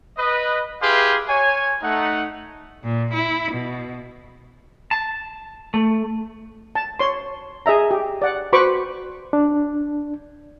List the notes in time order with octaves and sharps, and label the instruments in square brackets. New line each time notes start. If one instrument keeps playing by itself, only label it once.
[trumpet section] B4 D#5
E4 G4 G#4 B4 F5 C6
C#5 G#5
A3 D#4 F#5
[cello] A#2
E4
B2
[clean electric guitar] A5
A3
[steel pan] A5
C#5 C6
G#4 D#5 E5 A#5
G4
D5 F#5
F#4 B4 C5 B5 C#6 D6
[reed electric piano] D4